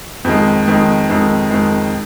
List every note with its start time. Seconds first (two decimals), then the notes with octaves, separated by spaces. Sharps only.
0.25 F2 D#3 G#3
0.68 F2 D#3 G#3
1.10 F2 D#3 G#3
1.50 F2 D#3 G#3